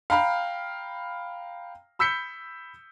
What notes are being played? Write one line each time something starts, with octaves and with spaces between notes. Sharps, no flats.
F5 G5 A#5 B5 F6
B5 E6 G6 B6 C#7 G7